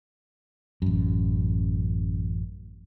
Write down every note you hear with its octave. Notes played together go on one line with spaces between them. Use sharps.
A1 F#2